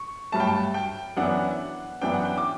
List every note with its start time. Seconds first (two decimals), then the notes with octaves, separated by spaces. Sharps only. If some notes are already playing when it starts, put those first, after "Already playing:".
Already playing: C#6
0.32 G2 F#3 A3 A5
0.40 G5
0.47 A5
0.74 G5
1.17 F#2 E3 B3 D4 F#5
2.02 F#2 E3 B3 D4 G5
2.13 F#5
2.25 G5
2.38 D6